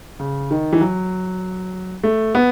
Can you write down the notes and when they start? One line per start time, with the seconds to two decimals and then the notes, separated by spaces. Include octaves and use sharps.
0.19 C#3
0.51 D#3
0.73 E3
0.81 F#3
2.03 A3
2.35 B3